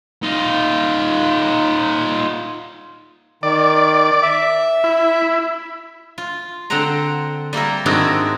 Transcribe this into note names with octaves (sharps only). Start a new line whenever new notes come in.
D#4 F4
D#3 D5
E5
E4
F4
D3 C4 C5 F#5 A#5
G3 A#3 E4 A#4
G#2 D#3 C4 D4 E4 F#4